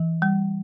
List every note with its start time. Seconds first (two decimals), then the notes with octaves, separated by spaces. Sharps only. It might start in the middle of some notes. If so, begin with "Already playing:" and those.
Already playing: E3
0.22 G3